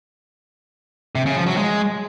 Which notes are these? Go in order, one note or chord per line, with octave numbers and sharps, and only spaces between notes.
C3
C#3
F3
F#3
G#3